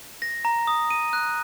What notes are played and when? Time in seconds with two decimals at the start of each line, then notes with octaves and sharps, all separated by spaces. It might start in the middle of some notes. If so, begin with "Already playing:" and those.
0.22 A#6
0.45 A#5
0.67 D#6
0.90 D#7
1.13 F#6